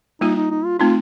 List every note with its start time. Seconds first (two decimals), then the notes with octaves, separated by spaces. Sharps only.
0.21 G3 A#3 D#4 F4
0.36 D#4
0.51 D#4
0.65 F4
0.79 A3 C4 D#4 F4